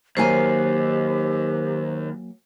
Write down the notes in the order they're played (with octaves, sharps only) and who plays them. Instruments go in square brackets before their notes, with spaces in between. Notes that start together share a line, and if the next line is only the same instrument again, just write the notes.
[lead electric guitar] D#2 [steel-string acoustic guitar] F#3 A#3 G#5 [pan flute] G4 [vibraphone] C5